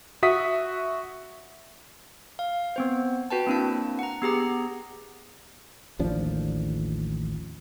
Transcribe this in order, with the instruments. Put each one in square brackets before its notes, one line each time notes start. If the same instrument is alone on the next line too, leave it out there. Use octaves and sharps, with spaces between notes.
[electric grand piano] F#4 E5 D#6 B6
[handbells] F5
B3 C4 C5
F#4 B4 G5 A5
A#3 C4 D4 E4 A5
F#5 A#5
B3 G4 G#4 A#5
[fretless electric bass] A1 D#2 F3 D4